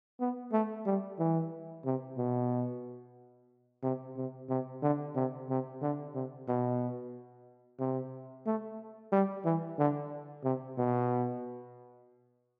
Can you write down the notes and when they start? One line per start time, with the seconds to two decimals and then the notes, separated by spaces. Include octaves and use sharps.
0.20 B3
0.52 A3
0.86 G3
1.19 E3
1.85 C3
2.18 B2
3.83 C3
4.16 C3
4.49 C3
4.82 D3
5.16 C3
5.49 C3
5.82 D3
6.15 C3
6.48 B2
7.80 C3
8.46 A3
9.12 G3
9.45 E3
9.79 D3
10.44 C3
10.78 B2